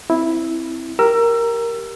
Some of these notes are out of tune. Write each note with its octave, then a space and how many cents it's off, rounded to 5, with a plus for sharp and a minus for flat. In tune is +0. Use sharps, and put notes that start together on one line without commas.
C4 +0 E4 -5
G4 +0 A#4 +0 E6 +25